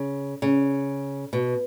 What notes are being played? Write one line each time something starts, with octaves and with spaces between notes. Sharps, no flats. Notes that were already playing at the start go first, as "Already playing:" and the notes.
Already playing: C#3
C#3
B2